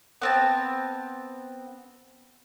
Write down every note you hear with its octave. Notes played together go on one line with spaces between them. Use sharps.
B3 C4 A5